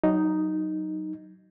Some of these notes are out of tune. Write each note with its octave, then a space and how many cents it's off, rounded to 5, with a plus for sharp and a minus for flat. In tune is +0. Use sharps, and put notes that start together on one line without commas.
F#3 +20 D#4 +0